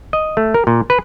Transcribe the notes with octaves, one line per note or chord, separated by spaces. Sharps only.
D#5
A3
A#4
A#2
B4